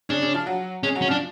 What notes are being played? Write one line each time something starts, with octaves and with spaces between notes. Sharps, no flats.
C#3 C#4 D4
C#3 C#4
F3 F4
F#3 F#4
G#3 C#4 G#4
F#3 F#4
C#4
F3 D4 F4